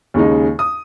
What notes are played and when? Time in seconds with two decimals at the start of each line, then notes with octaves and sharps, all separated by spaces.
0.14 D#2 C#3 G#3 D#4
0.59 D#6